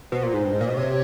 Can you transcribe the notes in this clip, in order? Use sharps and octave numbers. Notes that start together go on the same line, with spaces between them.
B2 C5
A#2
G#2
G2
G#2
A#2
B2
C3 C#5